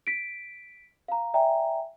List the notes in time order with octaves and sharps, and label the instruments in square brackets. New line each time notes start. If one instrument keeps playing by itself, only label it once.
[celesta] B6 D7
F5 A#5
D5 E5 G5 G#5 A#5